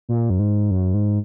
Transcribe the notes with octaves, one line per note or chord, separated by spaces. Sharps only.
A#2
F#2
G#2
F#2
G#2